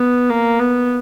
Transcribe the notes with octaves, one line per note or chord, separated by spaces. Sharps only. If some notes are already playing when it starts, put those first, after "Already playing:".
Already playing: B3
A#3
B3